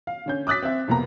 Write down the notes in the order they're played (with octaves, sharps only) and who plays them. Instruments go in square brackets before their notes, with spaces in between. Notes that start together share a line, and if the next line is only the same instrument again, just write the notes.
[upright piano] F5
D3 C#4 G6
D6 D#6 F#6 A6 B6
C4 E5
C2 F2 A#3 B3 A#5